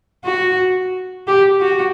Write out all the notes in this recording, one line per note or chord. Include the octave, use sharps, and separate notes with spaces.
F#4
G4
F#4